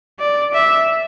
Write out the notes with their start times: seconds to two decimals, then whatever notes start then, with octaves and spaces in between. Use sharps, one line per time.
0.20 D5
0.54 E5